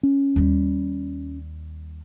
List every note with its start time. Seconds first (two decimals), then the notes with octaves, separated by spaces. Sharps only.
0.03 C#4
0.36 D#2 G3